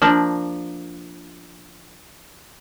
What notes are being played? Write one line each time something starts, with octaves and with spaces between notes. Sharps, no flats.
F3 A#3 D4